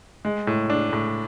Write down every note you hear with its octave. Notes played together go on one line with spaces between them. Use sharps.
G#3
A2
D4
A2